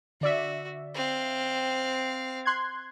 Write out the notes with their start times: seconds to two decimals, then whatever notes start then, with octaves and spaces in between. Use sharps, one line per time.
0.21 D3 F#4 D5 E5
0.94 C4 F5
2.45 C6 F#6 G#6